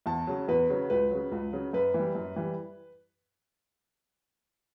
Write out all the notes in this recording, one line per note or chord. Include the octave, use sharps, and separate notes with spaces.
E2 A5
C#3 F#3
E2 B4
C#3 F#3
C#2 B4
C#3 F#3
C#2
C#3 F#3
F#2 B4
E3 G3
F#2
E3 G3